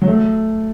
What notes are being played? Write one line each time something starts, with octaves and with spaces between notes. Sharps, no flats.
F#3
A3